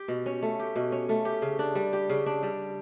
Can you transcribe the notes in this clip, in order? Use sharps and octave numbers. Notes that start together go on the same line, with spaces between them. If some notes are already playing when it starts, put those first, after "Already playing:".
Already playing: G4
B2
C#4
A3
G4
B2
C#4
A3
G4
C#3
D4
G3
G4
C#3
D4
G3